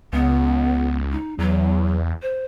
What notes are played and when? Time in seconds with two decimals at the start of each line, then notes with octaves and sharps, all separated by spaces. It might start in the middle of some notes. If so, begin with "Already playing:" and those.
0.13 C#2 B3
1.12 D#4
1.39 E2 F#3
2.22 C5